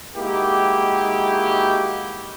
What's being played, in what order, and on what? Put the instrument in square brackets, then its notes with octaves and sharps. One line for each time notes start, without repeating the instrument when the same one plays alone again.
[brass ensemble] G#3 A#3 D#4 E4 F#4 G4